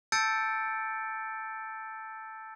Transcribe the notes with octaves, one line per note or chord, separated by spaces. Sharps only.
A5 E6 G6 A6 C#7 D7